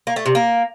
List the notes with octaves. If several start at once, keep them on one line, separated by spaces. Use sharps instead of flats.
A#3
A3
C3
A#3